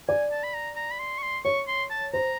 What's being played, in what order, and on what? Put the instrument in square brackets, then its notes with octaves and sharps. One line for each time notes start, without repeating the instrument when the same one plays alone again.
[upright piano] D5 [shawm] G#5
[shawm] A5
B5
A#5
A#5
B5
C6
C#6
C6
[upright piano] C#5 [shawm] C#6
[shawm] C6
A5
[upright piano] C5 [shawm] A#5